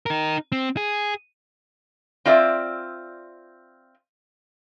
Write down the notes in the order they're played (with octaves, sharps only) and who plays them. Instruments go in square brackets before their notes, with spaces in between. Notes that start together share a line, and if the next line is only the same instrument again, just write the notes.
[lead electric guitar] D#4 A#4
C4
G#4
[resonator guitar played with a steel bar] C4 F4 D5 E5